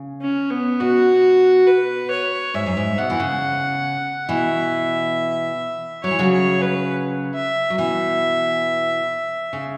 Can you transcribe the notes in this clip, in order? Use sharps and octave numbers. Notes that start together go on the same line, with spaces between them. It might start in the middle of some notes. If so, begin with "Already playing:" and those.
Already playing: C#3
C#4
B3
B2 F#4
B4
C#5
G#2 E5
F#2
G#2
B2 F#5
E3
C#3
B2 E3 E5
F#3 C#5
E3
C#3 F#3
C#5
B4
E5
F#3
B2 E3 E5
C#3